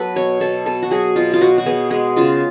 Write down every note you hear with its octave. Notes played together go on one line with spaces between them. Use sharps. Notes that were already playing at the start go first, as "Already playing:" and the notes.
Already playing: F#3 B3 A4 B4
B2 C#5
B2 A4
B3 A4
F#4
F#3 G#4
B2 F4
F4
B2 F#4
F#4
B3 G#4
G#3 G#4
C#3 F4